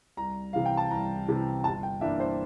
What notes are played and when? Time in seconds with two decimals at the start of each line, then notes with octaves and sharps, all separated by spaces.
0.17 C2 A#5
0.53 C3 E3 F5
0.66 G5
0.77 A5
0.91 C2 A#5
1.28 C3 E3
1.64 G1 A5
1.83 G5
2.01 G2 E3 A#3 D4 E5
2.20 C5